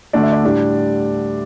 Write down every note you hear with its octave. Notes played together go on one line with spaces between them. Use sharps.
D2 D3 A3 D4 D5
E5
D5
A2 G3 D4